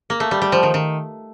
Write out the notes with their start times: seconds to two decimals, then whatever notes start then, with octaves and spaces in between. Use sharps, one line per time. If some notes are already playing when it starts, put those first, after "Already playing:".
0.10 A#3
0.20 A3
0.31 G3
0.42 G3
0.52 F3
0.63 D#3
0.74 D#3